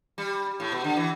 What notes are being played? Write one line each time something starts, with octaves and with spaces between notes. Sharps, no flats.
G3
A2
B2
D3
E3